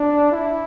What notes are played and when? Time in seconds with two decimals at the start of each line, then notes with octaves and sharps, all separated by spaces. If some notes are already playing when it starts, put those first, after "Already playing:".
Already playing: D4
0.32 E4